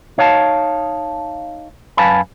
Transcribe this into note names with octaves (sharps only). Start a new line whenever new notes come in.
D#4 C#5 F5 G#5 A5
F#2 B4 F5 G#5 A5 B5